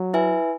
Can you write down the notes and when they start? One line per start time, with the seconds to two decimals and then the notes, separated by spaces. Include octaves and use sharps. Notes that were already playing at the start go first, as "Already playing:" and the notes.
Already playing: F#3
0.14 E4 B4 E5 G#5